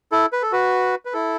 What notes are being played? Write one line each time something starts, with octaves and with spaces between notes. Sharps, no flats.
E4 A4
B4
A4
F#4 B4
B4
E4 A4